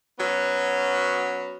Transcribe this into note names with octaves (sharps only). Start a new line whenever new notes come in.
F#3 B3 C#4